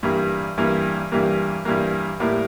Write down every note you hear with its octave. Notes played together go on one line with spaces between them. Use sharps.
G2 E3 G3 A#3
G2 E3 G3 A#3
G2 E3 G3 A#3
G2 E3 G3 A#3
A2 G3 A#3 E4